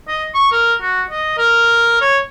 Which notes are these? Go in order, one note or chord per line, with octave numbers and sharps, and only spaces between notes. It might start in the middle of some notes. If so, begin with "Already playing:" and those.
D#5
C#6
A#4
F#4
D#5
A#4
C#5